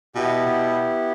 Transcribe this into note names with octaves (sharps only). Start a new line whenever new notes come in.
B2 B3 E4 G4
B2